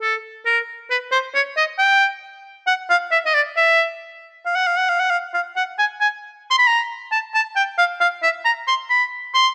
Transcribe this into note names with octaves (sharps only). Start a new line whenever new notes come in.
A4
A#4
B4
C5
C#5
D#5
G5
F#5
F5
E5
D#5
D5
E5
F5
F#5
F5
F#5
F5
F#5
F5
F5
F#5
G#5
G#5
C6
B5
A#5
A5
A5
G5
F5
F5
E5
A#5
C6
B5
C6